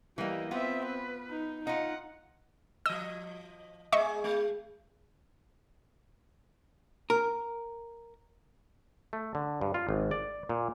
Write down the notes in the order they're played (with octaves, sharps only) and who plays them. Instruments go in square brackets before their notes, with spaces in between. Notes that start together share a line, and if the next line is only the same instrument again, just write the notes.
[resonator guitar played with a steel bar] E3 A#3 [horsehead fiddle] G3 D#5
[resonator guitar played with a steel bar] B3 F4 [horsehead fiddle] C4 E5
[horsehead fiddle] B4
D#4
[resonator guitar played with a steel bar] D#4 F4 [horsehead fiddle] F#5
[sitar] F3 D#5 [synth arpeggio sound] E6
[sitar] G#3 G#4 [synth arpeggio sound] D#5 E5 C#6
[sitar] G#3
[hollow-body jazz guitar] A#4
[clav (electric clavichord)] A3
D3
G2
F4
G#1
D5
A#2